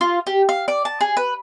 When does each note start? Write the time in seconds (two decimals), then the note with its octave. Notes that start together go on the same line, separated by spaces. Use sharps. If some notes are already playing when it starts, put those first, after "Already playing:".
0.01 F4
0.27 G4
0.49 F5
0.68 D5
0.85 A5
1.01 G#4
1.17 B4